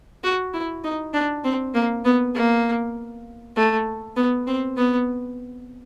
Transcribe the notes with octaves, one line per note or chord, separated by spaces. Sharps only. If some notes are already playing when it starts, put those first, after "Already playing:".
F#4
E4
D#4
D4
C4
A#3
B3
A#3
A3
B3
C4
B3